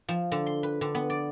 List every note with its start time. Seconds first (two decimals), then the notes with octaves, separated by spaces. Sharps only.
0.09 F3
0.32 D3
0.46 C6
0.63 B4
0.81 D3
0.95 B3
1.10 D5